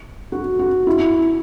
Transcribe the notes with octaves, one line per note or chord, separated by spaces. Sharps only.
F#4
F#4
E4